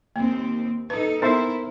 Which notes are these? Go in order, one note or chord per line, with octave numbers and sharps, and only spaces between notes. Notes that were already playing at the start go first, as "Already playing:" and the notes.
D#2 A#3 C4
D#4 A4 B4
B3 D#4 E4 A#4 C5 E5